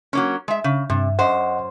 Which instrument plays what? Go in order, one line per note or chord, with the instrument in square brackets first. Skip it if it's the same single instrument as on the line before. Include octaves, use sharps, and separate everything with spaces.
[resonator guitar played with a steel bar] F#3 A#3 C#4
G#3 E5
C#3
[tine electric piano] G2 [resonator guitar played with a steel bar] C3
[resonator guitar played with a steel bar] F#2 C5 [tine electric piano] D#5 F#5